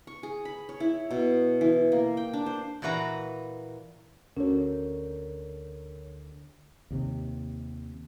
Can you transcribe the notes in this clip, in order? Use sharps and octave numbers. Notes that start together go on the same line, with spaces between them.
C#6
G#4
B5
C#5
E4
B2
E3
A#3
G5
D4
C5
A#2 E3 F#4 B4 A#5
D2 D3 C#4 F#4 A#4 C#5
D#2 C3